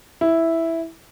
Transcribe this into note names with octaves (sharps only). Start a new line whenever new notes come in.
E4